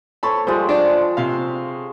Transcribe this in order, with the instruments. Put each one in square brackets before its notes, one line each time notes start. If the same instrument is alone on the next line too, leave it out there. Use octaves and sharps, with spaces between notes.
[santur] A4 C5 C#5 [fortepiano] A5 B5
[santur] F3 G#3 G5 [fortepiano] G3
[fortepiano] D4 D5
C3 F5